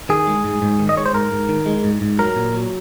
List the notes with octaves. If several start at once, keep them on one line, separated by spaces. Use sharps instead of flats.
D#3 G#4
G#3
G#2
G#2
D#3
D#5
G#3 C#5
C5
G#2 A#4
G#2
D#3
G#3
G#2
G#2
F#3 A#4
A#2
F#3